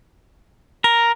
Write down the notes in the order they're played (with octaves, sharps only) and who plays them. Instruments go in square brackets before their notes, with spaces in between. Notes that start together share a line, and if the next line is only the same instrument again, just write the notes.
[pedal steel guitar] A#4